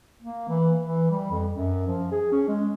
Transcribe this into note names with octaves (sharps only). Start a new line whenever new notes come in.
A#3
E3
E3
G3
F2
F#2
F3
G#4
C#4
G#3